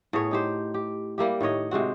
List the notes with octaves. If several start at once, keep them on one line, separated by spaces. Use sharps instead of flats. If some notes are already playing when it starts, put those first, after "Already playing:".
A2 B3 G#4 C#5
D#4 G4 C5
G4
G3 A#3 E4 G4
A2 D#3 C#5 D#5
C3 G#3 C4 F#4